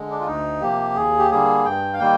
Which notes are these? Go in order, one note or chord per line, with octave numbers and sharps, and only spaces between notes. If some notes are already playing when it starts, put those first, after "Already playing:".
Already playing: D3 G#3
D4
F4
D2 D#4
C3 F3 A#3 G4
D#2 G#4
G4
D3 G3 A#3 G#4
G2 G5
F5
D#3 G3 A#3 G5